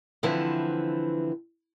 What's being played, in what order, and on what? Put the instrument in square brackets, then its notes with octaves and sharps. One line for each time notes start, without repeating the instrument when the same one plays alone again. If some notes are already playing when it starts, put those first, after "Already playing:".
[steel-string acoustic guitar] D3 E3 F3 C4 E4 B4